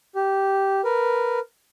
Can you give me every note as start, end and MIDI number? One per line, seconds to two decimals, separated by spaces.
0.15 0.81 67
0.84 1.39 70
0.84 1.39 71